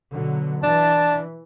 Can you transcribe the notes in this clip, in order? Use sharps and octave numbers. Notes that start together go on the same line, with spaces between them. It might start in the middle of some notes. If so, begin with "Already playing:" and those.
B2 D3 F#3
E3 D4 A5